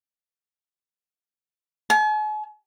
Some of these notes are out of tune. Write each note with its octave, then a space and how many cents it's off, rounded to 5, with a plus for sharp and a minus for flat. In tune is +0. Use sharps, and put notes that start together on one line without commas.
G#5 +45